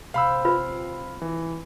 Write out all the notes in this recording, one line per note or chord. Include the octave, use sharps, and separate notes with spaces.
C3 F5 B5 E6
F4 B4
E3